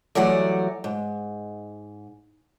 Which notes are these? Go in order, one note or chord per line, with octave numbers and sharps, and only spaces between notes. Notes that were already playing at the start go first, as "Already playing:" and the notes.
E3 F#3 G3 A3 D5 F#5
G#2